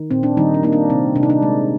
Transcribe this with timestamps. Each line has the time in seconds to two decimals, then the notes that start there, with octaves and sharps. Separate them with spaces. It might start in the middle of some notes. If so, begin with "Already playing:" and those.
Already playing: D#3 D#4
0.11 A#2 C4
0.23 D4
0.37 D#3 G3 D#4
0.54 D4
0.63 A#3 D#4
0.73 D4
0.90 C3 C4
1.16 C3 D4
1.23 D#4
1.30 D4
1.42 G#3